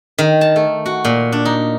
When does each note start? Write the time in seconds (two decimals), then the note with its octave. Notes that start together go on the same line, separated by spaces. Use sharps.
0.18 D#3
0.41 A5
0.56 A3
0.86 F#4
1.05 A#2
1.32 D4
1.45 D#4